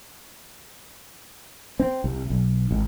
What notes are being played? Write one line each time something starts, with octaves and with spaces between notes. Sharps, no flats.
C4
C2
B1
G#1